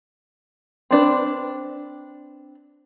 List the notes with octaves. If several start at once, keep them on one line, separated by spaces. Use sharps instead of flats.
C4 D4 B4